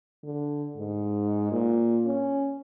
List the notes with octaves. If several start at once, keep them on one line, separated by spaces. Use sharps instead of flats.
D3
G#2
A#2
C#4